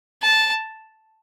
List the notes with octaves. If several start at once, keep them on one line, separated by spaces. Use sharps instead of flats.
A5